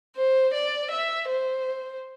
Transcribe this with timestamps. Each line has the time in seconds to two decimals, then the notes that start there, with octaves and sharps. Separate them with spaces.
0.16 C5
0.54 D5
0.91 E5
1.29 C5